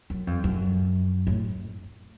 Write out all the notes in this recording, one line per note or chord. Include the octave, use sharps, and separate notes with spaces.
F#2
F2
F#2
A2